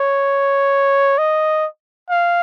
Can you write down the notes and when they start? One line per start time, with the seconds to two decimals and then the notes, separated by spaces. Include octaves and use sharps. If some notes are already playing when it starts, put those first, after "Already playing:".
Already playing: C#5
1.18 D#5
2.10 F5